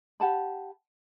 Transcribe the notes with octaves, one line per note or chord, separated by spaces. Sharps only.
G4 F#5 A5 B5